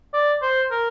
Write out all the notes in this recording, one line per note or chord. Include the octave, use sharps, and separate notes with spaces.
D5
C5
A#4